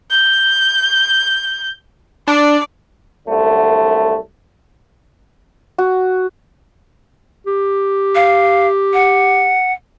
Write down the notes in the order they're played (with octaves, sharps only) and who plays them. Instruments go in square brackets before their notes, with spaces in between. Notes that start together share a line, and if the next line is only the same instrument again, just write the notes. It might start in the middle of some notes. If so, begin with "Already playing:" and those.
[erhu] G6
[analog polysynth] D4 [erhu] D5
[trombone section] C2 F#2 D3 A3
[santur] F#4
[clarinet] G4
[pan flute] F5
F#5